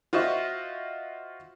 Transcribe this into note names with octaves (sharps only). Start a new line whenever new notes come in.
F4 F#4 C5 D#5 E5 C#6